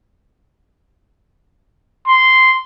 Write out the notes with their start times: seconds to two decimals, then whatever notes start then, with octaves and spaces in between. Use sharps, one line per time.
2.07 C6